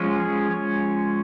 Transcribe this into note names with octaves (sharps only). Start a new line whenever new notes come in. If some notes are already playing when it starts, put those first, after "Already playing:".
Already playing: F3 G#3 C#4
G#4
C#5